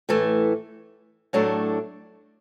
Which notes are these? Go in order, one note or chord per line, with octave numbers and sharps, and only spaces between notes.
A2 E3 A3
A2 F#3 A3 D4